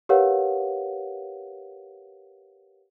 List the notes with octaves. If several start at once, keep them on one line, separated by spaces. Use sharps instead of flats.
G4 A#4 B4 C#5 F5 F#5